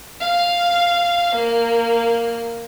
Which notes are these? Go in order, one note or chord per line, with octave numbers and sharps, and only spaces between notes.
F5
A#3